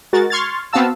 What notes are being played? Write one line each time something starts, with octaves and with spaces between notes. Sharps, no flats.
G#3 F#4 A#4 A6
C6 C#6 F6 G#6 A6
B3 C4 F#4 F5 A5 E6